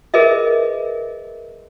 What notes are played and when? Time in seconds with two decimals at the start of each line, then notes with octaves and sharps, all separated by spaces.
0.14 G#4 A#4 B4 D#5 E5